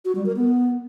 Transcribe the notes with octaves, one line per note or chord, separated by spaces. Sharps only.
F#4
G3
A#4
B3